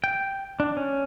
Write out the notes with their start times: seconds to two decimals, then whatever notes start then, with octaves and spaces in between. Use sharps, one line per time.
0.04 G5
0.60 D4
0.77 C#4